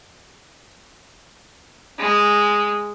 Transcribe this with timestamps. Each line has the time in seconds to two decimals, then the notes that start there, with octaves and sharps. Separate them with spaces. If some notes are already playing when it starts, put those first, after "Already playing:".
1.99 G#3